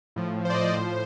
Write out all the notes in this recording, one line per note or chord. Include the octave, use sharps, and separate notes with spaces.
A2 F3
C5
D5
D#5
C5
A2 F3